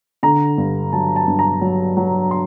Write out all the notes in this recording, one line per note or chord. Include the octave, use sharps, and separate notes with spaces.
D3 A#5
G2
F#3 A5
A5
G2
A#5
F#3
F#3
C6